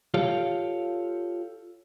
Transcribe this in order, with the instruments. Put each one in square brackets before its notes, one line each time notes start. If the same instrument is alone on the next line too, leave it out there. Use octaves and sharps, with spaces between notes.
[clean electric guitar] F4 G4 A4 C#5 F5